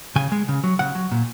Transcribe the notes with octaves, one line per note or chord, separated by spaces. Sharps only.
C#3 G#5
G#3
C#3
F#3
C#3 F#5
F#3
A#2